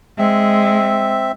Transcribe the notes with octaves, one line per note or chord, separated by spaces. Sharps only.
G#3 C4 E5